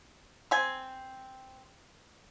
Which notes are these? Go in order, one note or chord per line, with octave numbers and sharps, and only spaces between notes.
C4 G#5